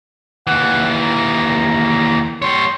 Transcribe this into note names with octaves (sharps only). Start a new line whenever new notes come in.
D#2 E3 F#5
A#5
G3 C#5 C6